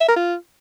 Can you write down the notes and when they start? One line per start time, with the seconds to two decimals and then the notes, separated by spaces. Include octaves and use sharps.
0.01 E5
0.08 A#4
0.16 F4